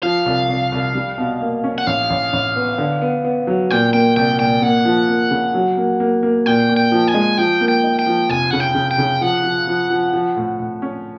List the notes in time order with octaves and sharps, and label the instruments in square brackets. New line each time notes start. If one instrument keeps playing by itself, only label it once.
[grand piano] F3 [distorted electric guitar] F5
[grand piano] C2
C2
C2
G3
B2
A#3
C#4
[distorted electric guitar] F#5
[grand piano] A1 [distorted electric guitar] F5
[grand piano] A1
A1
B3
D3
B3
B3
F#3
[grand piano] A#2 [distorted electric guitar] G5
[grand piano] A#3 [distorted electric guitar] G5
[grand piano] C2 [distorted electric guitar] G5
[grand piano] A#2 [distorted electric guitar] G5
[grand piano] A#3 [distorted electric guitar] F#5
[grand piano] F3
A#3
C#3
F#3
A#3
A#3
A#3
[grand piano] A#2 [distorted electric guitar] G5
[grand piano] A#2
[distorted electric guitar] G5
[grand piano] F3
[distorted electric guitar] G#5
[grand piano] G#3
[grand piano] F3 [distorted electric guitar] G5
[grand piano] A#3
[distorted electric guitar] G5
[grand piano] D#4
[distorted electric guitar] G5
[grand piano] F3
[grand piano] F1 [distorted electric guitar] G#5
[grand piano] C#3 [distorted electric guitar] F#5
[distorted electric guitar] G5
[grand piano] C#3
[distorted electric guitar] G5
[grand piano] C#3
[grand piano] F3 [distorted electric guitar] F#5
[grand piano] F3
F3
F3
F3
A2
A2
C#4